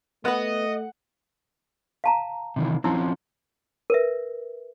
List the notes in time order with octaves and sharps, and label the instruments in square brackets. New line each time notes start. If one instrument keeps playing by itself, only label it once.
[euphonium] A3 [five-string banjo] B3 B4 [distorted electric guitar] D#5 [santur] F#5
[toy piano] F5 A5 A#5
[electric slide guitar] C3 D#3 E3
[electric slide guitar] F3 C4 C#4 [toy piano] D#4 E4 E6
[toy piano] A#4 B4 E5